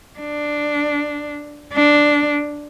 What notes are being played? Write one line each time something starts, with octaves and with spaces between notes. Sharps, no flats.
D4
D4